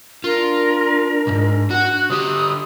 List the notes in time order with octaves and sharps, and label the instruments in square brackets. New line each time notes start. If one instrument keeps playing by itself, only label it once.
[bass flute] D4 [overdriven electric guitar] F4 [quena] A#4
[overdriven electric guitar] B1 G#2
[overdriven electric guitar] F#4 F#5 [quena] F#6
[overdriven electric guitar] D3 G4 [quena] D#6